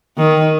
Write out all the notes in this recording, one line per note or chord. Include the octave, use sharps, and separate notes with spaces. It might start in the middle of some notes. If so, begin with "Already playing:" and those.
D#3